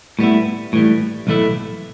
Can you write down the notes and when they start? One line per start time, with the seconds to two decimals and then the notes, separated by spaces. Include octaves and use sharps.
0.19 A2 G3 B3 E4
0.73 A2 E3 G3
1.27 B1 A2 E3 A3 E4